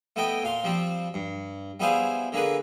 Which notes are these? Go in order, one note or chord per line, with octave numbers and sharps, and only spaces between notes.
A3 B3 E4 D#5 G5
A#2 F5 C6
F3 G3 C4
G2
G3 B3 E4 G#4 C5 F5
D3 A#3 G#4 B4